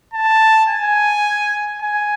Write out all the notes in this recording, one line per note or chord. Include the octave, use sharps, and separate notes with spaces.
A5
G#5
G#5